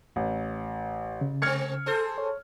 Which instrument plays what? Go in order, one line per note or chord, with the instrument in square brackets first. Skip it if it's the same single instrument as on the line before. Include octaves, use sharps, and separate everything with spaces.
[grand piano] A1
[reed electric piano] C#3
[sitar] G#3 C4 [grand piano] F6 G#6 C#7
[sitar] G#4 A4 C5
[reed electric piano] C#5